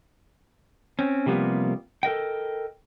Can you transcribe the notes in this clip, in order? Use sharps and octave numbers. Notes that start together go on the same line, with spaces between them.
C4 C#4
C3 F3 G3 A#3 B3
A4 A#4 D#5 G5